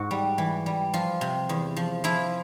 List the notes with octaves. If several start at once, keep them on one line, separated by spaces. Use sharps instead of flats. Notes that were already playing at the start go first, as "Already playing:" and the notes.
Already playing: G#2 F#4
G3
E3
G3
F3 F4
C3
E2
F3
F3 E4